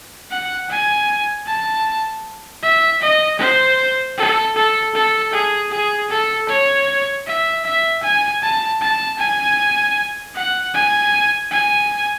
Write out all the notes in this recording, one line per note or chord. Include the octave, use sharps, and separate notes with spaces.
F#5
G#5
A5
E5
D#5
C5
A4
A4
A4
G#4
G#4
A4
C#5
E5
E5
G#5
A5
A5
G#5
F#5
G#5
G#5